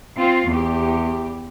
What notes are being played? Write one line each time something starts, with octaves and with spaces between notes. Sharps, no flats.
C4 F4
E2 G4